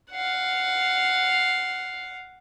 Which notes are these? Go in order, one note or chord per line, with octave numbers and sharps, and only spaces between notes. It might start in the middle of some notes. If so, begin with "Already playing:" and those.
F5 F#5